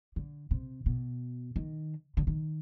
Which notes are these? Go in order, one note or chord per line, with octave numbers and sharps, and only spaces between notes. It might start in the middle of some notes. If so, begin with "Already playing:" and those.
D3
C3
B2
D#3
D3
D#3